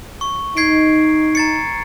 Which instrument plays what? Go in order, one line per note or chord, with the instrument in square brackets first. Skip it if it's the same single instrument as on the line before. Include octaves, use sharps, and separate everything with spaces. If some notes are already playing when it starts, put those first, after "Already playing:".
[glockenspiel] C#6
[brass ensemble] D#4 [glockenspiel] G#6 C7 D7
[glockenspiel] A#5 A6 C#7